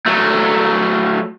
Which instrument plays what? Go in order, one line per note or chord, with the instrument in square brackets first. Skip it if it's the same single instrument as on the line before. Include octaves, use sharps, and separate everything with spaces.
[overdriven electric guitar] F#3 A3